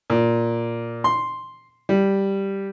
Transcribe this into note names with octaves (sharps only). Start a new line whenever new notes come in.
A#2
C6
G3